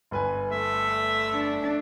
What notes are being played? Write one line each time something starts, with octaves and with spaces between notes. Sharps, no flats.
G1 B4 G#5
A3 E5
D4